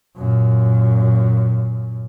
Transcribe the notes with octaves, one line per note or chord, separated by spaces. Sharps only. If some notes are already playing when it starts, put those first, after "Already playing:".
F#2 A#2